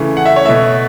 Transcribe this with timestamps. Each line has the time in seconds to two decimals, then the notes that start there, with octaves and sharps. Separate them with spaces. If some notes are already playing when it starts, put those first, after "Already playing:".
Already playing: C#3 E3 A3
0.17 F#5
0.26 E5
0.36 C#5
0.45 B2 A3 E5